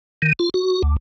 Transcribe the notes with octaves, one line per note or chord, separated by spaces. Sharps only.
D#3
F4
F#4
D2